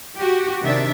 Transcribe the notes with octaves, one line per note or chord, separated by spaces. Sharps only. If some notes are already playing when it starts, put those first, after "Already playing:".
F#4 G4
C3 D#3 D4 E5